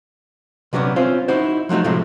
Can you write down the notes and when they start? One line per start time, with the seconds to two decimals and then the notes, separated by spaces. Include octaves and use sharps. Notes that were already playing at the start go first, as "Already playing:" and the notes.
0.73 C3 F#3 B3 C#4 D4
0.96 C4 C#4 F4 C5
1.28 D#4 E4 F#4 C5
1.69 F3 F#3 A3 D#4 F#4
1.84 A2 C3 F3 F#3 G#3 A3